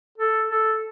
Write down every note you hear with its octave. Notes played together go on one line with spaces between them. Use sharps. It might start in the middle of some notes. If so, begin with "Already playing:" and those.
A4
A4